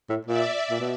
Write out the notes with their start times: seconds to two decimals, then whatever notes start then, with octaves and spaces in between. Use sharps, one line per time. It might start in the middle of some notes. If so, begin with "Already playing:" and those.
0.09 A2
0.26 A#2 D5 E5
0.70 A#2
0.80 B2